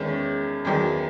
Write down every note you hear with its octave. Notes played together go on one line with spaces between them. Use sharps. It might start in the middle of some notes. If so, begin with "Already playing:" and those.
Already playing: E2 D#3 G#3 C#4
E2 D#3 F#3